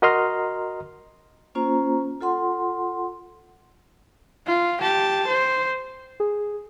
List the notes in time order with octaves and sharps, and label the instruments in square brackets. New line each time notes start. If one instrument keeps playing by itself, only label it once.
[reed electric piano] F#4 A#4 D#5 A#5 C6 F6
[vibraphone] A#3 C#4 F4 C5 A#5
F4 A4 F#5 C6
[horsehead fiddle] F4
G4 A5
C5
[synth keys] G#4